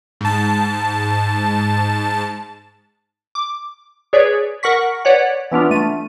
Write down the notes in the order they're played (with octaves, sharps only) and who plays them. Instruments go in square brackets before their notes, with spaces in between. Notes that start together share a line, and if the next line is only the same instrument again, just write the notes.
[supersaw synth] G#2 A5
[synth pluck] D6
G#4 B4 C#5 D5
A#4 F#5 C#6 B6
B4 C#5 D5 F#5
E3 B3 D4 F4
A3 D#7